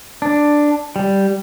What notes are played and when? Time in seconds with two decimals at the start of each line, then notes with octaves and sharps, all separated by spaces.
0.22 D4
0.96 G3